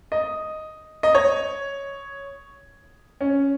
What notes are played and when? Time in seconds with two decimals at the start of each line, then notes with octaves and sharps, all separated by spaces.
0.12 D#5
1.03 D#5
1.15 C#5
3.21 C#4